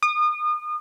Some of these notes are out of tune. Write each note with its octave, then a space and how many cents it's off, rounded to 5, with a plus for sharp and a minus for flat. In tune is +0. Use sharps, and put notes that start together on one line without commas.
D#6 -35